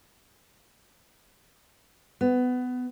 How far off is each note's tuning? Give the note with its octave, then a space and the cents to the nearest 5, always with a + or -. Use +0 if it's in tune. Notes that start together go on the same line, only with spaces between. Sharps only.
B3 +20